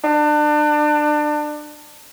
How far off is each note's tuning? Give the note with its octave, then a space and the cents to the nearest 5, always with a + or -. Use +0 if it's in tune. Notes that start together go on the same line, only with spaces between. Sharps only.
D4 +30